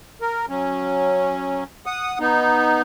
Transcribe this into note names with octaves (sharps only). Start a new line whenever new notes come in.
A#4
F#3 C#4
F#5 D#6
B3 D#4